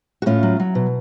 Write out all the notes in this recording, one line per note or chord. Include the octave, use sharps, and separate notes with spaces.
F#4
A2 C#4 F4
F#3
F#3
B2